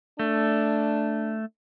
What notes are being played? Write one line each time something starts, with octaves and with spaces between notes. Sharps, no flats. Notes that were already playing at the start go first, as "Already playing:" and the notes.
A3 D4